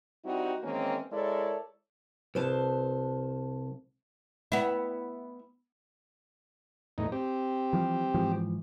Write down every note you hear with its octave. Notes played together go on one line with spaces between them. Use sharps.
G3 C4 D#4 E4 F#4
D#3 E3 G#3 A#3 C4 C#4
G#3 E4 A4 A#4 C#5 D5
C2 B4 C5 A5
B3 E4
E2 A2 D#4
C4 G4
E3 F3 G3
G#2 E3 F3